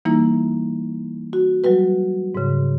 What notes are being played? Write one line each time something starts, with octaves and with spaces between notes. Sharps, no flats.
E3 G3 A#3 D#4 E4
F#4
F#3 G3 F#4 B4
G#2 C#3